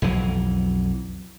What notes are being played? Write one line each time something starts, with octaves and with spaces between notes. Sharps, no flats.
B1 F2 E3 F#3